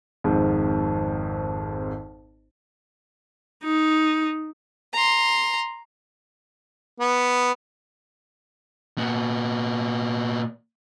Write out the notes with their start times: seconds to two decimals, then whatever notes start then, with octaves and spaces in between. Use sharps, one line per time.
0.24 G#1 F2 G#2
3.64 D#4
4.93 A#5 C6
7.00 B3
8.98 A#2 B3